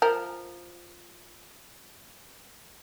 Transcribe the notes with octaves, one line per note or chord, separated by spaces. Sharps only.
F3 A#4